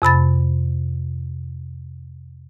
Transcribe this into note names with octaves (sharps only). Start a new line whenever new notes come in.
F2 C3 B5 A6